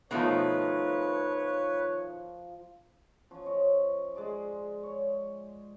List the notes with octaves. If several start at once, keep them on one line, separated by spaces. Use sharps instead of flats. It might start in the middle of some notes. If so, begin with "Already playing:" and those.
B2 D#3 F3 A3 B4 C#5 A#5
F3 C#4
C#5 D#5
G#3 G#4 D5 C6
C#5